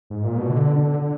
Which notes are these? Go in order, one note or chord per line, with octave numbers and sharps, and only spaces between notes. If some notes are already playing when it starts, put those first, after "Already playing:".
G#2
A#2
B2
D3
D3
D3